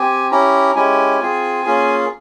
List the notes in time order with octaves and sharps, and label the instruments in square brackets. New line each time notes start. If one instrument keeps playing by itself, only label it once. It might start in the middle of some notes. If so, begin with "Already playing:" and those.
Already playing: [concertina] C4 G4 G#5
C#4 E4 G4 A#5
G#3 C#4 E4 G4 G#5
C4 F4 G#4
A#3 C#4 F4 G#4